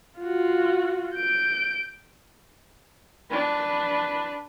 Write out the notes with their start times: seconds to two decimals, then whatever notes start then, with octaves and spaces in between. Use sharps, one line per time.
0.20 F4 F#4
1.15 G6 D7
3.30 D4 B4